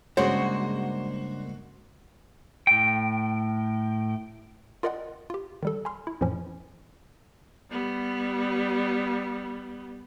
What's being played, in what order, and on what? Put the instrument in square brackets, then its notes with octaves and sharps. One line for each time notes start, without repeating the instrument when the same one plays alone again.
[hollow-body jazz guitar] G2 C#3 G#3 [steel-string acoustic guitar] A#3 D4 C#5 [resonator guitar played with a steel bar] F#4 [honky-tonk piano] C5
[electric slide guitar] A2 G5
[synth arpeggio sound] F4 A#4 D5 D#5 F#5 G5
F4 G4
D#3 G3 A4
G#5 B5 C6 F6
E4
F2 A2 E3 F3 C#4
[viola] G3 B3